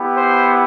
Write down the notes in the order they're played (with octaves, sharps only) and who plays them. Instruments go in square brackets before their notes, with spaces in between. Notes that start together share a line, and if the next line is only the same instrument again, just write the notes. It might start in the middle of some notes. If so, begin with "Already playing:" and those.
Already playing: [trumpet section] B3 E4 G4
C5